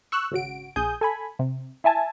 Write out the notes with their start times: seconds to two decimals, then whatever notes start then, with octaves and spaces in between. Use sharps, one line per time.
0.12 C#6 E6 F#6
0.31 G#1 C#3 F#4 D7
0.76 A#1 G#4 G#5 D#6 G6
1.01 A4 G#5 B5
1.39 C3
1.84 E4 E5 G#5 A5